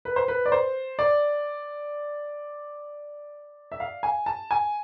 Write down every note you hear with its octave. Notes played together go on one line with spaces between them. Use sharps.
B4
C5
B4
D5
C5
D5
E5
F5
G#5
A5
G#5